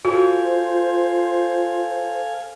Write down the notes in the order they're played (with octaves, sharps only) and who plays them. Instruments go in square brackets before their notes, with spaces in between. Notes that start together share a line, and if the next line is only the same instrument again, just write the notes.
[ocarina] F4 [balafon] F#4 [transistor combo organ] A4 F5 G#5 [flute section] C5